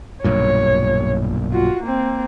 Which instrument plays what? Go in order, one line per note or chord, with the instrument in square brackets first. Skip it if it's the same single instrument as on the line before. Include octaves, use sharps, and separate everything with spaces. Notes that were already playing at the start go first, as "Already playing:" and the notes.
[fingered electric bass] B1 G2 A#2 [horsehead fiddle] C#5
[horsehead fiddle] F4 F#4
A#3 C4